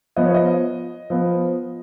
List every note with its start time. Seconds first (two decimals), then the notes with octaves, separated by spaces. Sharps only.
0.16 F3 B3 D#5
0.26 C#5
0.34 D#5
1.10 F3 B3